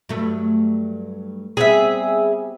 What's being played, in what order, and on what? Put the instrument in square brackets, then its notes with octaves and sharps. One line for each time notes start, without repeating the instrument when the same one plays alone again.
[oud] G2 F#3 A3
[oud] G3 B3 C4 [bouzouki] G#4 E5